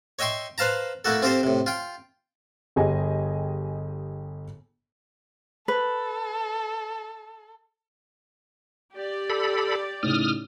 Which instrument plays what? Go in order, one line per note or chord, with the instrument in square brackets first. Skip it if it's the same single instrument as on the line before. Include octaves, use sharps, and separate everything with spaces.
[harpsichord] C#5 D#5 E5 G5 C6 C#6
B4 C5 F5 A5 A#5
A3 A#3 E4 F#4 A4
C4 F4 G4 A4 C5
A2 C3
F4 G5
[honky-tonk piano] G1 G4 G#4 D#5 G#5
[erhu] A4 [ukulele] B4
[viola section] G4 D5
[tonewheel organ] A4 B5
[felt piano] A2 C#3 D#4 [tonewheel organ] D#6 F6